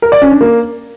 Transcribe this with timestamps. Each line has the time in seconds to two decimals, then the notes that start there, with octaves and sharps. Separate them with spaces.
0.02 A#4
0.12 D5
0.22 C#4
0.31 D4
0.41 A#3